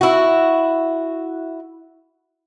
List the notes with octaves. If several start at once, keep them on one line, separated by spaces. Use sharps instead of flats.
E4 F#4